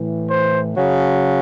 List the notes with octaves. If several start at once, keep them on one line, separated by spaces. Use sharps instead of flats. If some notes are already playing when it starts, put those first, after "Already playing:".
Already playing: A2 E3
C5
C#3 F#3